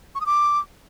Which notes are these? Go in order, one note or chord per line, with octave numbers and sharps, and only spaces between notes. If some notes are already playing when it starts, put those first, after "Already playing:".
C#6
D#6
D6